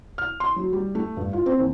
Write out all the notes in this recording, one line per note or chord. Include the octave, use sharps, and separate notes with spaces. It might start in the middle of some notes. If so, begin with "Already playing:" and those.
F6
C6
F#3
G3
A3
G2
F4
C4
D#2